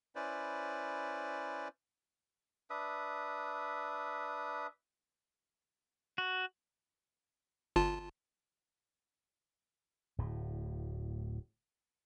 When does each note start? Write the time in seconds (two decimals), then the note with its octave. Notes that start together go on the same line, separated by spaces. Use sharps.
0.16 C#4 E4 B4 C5 D5
2.70 D4 B4 E5 D#6
6.18 F#4
7.76 G1 F4 A5
10.18 D1 A2